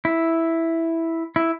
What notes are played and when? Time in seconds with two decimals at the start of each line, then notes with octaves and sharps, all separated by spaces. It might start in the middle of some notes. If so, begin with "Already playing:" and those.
0.05 E4
1.36 E4